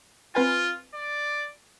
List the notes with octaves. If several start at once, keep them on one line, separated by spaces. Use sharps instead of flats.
C4 F4 B4 G#5
D5